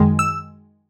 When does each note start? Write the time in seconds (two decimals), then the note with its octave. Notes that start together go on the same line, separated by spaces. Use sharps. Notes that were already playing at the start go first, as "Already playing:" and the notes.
Already playing: F#2 D#3 G#3
0.19 E6